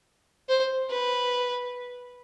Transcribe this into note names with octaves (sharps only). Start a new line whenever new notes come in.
C5
B4